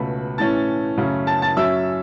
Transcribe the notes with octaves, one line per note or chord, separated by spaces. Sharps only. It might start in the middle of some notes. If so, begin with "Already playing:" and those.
Already playing: C#2 B2 A3 C#4 B5
A2 E3 A3 C#4 A5 A6
F#2 C#3 A3 C#4
A5 A6
A5 A6
F#2 F#3 C#4 E5 E6